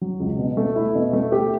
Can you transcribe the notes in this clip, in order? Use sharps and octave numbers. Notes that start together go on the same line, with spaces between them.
F#3
C#2
B2
A3
E4
B2
A3
G4